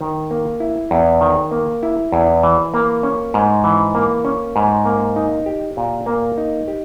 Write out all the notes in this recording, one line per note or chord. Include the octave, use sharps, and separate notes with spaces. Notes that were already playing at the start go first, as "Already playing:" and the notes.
D#3
A#3
E4
E2
D#3
A#3
E4
E2
E3
A#3
C#4
G#2
E3
A#3
C#4
G#2
A#3
D#4
G4
A#2
A#3
D#4
G4